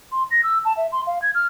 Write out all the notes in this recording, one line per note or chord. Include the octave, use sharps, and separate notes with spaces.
C6
A#6
E6
A5
E5
C6
F5
G#6
F6